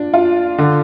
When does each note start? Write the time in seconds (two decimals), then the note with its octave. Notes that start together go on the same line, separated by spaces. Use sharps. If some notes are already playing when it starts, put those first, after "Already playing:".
Already playing: A#2 D4
0.14 F4
0.58 D3